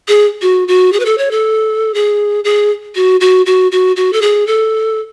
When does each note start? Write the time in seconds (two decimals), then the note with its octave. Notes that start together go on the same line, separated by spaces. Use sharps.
0.08 G#4
0.42 F#4
0.68 F#4
0.93 G#4
1.00 B4
1.05 A4
1.18 C#5
1.31 A4
1.94 G#4
2.44 G#4
2.95 F#4
3.20 F#4
3.46 F#4
3.72 F#4
3.96 F#4
4.13 A4
4.22 G#4
4.47 A4